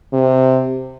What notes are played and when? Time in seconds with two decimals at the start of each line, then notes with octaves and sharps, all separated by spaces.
0.13 C3